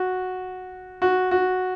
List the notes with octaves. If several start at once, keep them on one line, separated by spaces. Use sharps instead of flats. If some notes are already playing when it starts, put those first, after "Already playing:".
Already playing: F#4
F#4
F#4